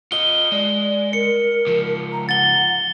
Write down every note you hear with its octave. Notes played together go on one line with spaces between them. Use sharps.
F4 D#5 G7
G#3 D5
A#4 C#7
C#2 F3
A#5
F#5 A6 G7